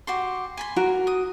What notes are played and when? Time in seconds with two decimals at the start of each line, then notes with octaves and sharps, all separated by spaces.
0.07 F#4 G4 C6
0.57 G#5 B5 C6
0.76 F#4 A#4
1.07 D#6